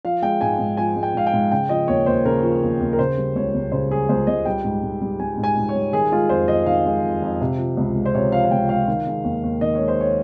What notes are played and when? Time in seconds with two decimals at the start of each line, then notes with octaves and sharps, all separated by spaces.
0.05 F3 F5
0.22 G#3 G5
0.41 G#2 G#5
0.59 G#2
0.77 F3 G#5
0.96 G#3
1.03 G5
1.14 G#2 F5
1.27 G5
1.33 G#2
1.52 C#3 G5
1.69 F3 D#5
1.88 D#2 C#5
2.06 D#2 C5
2.25 C#3 A#4
2.43 F3
2.63 D#2
2.80 D#2
2.93 A#4
2.98 C#3 C5
3.18 G3
3.36 C#2 C#5
3.55 C#2
3.72 C#3 C5
3.90 G3 G#4
4.09 C#2 C5
4.27 C#2 D#5
4.45 G3 G5
4.64 G#2
4.83 G#2
5.02 G3
5.20 G3 G#5
5.37 G#2
5.44 G#5
5.57 G#2
5.69 C#5
5.75 G3
5.93 D#3 G#4
6.12 G#3 F4
6.29 F2 C5
6.48 F2 D#5
6.66 D#3 F5
6.86 G#3
7.04 F2
7.22 F2
7.41 C3
7.58 F3
7.77 C#2
7.95 G#3
8.06 C5
8.14 C3 C#5
8.32 F3 F5
8.44 F5
8.50 C#2 G5
8.69 G#3 F5
8.88 D#3
9.07 G#3
9.24 D#2
9.43 D#2
9.61 D#3 D#5
9.75 G#3 C#5
9.88 C5
10.01 C#5